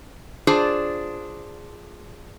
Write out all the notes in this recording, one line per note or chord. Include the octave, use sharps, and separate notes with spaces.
D4 F4 G#4 C5 D5